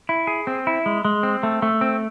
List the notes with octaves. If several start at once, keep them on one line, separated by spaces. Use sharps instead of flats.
E4
G#4
C4
E4
G#3
G#3
C4
A3
A3
C4